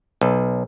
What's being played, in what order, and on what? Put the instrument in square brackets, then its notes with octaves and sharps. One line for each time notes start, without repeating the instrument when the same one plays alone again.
[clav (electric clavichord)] B1